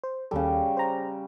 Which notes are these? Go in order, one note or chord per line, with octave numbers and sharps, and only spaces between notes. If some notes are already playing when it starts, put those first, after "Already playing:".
C5
D#2 C#3 G3 A4
C5 A#5